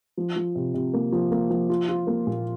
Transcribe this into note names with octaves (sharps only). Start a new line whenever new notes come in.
F3
F3
C3
C3
A#3
F3
A#3
F3
F4
F4
A#3
A#2